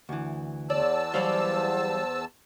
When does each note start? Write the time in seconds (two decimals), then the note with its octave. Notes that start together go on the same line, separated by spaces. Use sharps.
0.09 D2 E3
0.70 E2 C#5 D5 A5 E6
1.14 E3 F#3 G3 C5 D5 F5